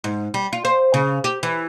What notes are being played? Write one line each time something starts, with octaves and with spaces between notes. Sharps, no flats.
G#2
G3
F4
C5
C#3
G4
E3